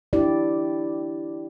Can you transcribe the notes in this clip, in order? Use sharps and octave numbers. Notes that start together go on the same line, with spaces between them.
D4 E4 G4 D5